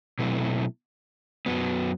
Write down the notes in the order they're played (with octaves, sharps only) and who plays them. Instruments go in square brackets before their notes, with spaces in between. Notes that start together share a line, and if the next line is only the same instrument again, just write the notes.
[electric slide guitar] B2 F#3 A3 C4 E4
F#2 F#3 B3